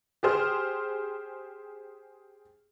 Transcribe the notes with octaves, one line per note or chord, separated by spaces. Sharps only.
G4 G#4 C5 F6